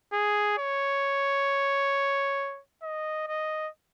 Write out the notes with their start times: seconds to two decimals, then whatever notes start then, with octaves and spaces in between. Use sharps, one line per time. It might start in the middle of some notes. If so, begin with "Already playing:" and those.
0.13 G#4
0.58 C#5
2.82 D#5
3.28 D#5